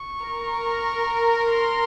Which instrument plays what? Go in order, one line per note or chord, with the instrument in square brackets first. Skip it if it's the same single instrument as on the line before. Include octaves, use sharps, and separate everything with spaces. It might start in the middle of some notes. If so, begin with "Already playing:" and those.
Already playing: [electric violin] C#6
[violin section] A#4
[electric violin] C6